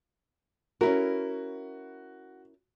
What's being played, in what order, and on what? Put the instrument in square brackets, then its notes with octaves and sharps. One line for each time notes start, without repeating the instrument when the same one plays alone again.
[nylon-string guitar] C#4 E4 A#4 [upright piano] F#4